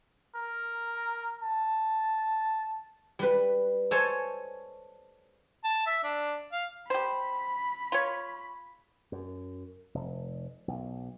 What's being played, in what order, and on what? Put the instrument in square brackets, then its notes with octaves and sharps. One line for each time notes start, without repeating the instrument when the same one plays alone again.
[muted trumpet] A#4
A5
[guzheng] G3 B4
A4 C5 C#5 G#5 A5
[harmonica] A5
E5
D4
F5
[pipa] G4 C5 [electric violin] B5
[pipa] F4 C#5
[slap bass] F#2
F1
B1